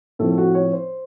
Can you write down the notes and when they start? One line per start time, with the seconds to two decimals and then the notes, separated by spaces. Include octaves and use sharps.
0.19 A2 F3 C4 A4
0.31 A4
0.38 F#4
0.55 C#5
0.73 C5